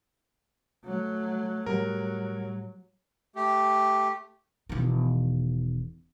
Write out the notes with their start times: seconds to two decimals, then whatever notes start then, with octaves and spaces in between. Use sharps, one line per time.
0.85 F#3 A3
1.66 A2 F#3 G3 A#4
3.36 A3 G4
4.69 E1 D#3